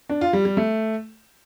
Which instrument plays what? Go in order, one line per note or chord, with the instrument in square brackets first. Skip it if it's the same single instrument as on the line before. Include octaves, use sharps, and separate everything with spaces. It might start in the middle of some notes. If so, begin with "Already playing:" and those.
[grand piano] D4
F4
G3
G3
A3